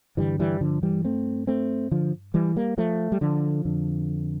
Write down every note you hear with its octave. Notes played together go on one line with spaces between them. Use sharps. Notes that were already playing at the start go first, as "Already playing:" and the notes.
G2 D3 E3 G3
E3 G3
D3 F3
E3 G3
A3 C4
A3 C4
D3 F3
E3 G3
G3 A#3
F3 A3
G3
D3 F3
F2 D3